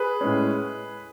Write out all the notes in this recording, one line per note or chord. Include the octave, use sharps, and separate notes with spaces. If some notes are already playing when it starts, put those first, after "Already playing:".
Already playing: G#4 B4
A2 G#3 C#4